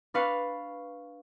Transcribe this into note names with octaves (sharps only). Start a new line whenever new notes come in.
D4 B4 F5 C#6